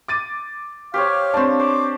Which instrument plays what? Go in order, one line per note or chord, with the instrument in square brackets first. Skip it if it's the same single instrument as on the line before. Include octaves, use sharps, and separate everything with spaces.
[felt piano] D6 A6 D#7
[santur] G4 C5 C#5 [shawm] F5
[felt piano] C4 D4 [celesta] A5 C#6
[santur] C5 [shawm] D6